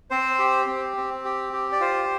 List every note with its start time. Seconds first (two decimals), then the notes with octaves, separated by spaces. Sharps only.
0.10 C4 C5
0.39 G4
0.67 C4
0.97 C4
1.25 G4
1.53 G4
1.72 D5
1.80 F4 C5